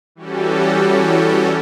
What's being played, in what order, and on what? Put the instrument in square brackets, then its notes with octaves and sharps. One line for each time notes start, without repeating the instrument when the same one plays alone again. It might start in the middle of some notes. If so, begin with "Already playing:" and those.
[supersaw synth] E3 G3 C#4 F#4 G4 A4